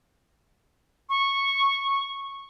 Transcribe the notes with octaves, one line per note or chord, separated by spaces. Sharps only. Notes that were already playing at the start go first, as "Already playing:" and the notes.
C#6